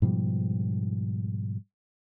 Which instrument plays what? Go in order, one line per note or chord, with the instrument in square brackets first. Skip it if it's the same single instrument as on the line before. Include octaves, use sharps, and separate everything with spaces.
[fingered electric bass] G#2 B2 F3 G3